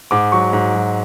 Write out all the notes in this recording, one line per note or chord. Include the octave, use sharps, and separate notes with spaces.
G#2 D6
F#3 C#6
G#2
F#3